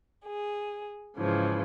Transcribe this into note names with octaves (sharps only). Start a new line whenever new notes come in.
G#4
G#2 C#3 E3 F3